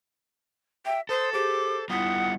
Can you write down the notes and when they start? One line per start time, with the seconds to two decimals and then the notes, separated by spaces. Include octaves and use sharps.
0.86 E5 G5
1.09 A4 C5 D#6
1.33 G4 G#4 C5 D6
1.90 G3 B3 E4 F4 F#5 D#6 B6 G7